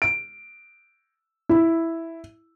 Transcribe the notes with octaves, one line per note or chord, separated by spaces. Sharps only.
D7
E4